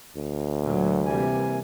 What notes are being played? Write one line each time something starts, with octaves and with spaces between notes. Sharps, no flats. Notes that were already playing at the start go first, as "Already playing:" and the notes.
D2
A#2 F#3
C3 E3 G3 A#3 G#5